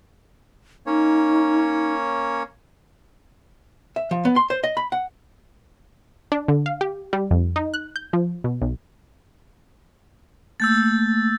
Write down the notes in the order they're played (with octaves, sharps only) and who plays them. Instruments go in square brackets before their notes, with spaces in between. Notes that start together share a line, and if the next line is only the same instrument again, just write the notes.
[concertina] A#3 C#4 C#5 [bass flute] D#4
[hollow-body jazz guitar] E5
F3
B3
C6
C5
D#5
B5
F#5
[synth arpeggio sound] D4
D3
F5
G4
G3
F2
D#4
F#6
G6
F3
B2
B1
[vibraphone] A3 A#3 [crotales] E6 G6 A6